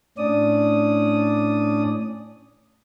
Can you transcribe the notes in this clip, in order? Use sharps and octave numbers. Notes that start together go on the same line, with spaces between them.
A2 C#4 D4 D5 D#6